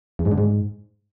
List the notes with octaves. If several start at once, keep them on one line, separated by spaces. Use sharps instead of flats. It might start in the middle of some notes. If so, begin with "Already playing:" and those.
E2
G#2
D3
G#2